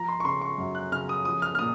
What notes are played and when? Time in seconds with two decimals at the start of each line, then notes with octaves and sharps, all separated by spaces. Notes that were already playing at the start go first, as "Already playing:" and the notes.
Already playing: F3 A#5
0.09 C6
0.20 C#6
0.24 C#3 C6
0.41 C#6
0.58 F#2
0.75 F#6
0.92 C#3 F6
1.09 D#6
1.25 F3 D#6
1.42 F6
1.55 F6
1.59 A#2 D#6